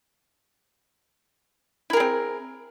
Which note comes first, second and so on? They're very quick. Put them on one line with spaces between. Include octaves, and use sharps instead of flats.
E4 A#4 G#4 C4